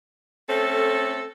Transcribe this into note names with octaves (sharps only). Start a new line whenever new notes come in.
A3 C4 C#4 A4